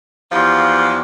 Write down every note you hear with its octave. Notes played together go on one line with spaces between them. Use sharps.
E2 F3 D4 G4 F5